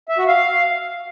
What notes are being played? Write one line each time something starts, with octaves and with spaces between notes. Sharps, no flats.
E5
F#4
F5